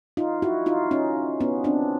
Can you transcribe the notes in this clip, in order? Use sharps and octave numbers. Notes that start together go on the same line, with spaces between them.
D#4 F4
E4 F#4
D#4 F4
C#4 D#4
B3 C#4
C4 D4